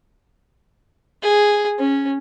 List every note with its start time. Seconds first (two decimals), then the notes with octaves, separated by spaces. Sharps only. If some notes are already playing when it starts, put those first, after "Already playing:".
1.22 G#4
1.79 C#4